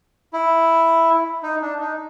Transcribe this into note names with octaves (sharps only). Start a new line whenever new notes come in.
E4
D#4
D4
D#4